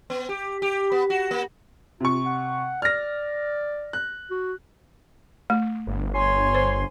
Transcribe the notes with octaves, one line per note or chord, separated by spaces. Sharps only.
B3
G4
G4
B3
F#4
A#3
C3 F4 C#6
F#5
D5 F6 A#6
F#6
F#4
A3
G1
C#5 G#5 C6
C5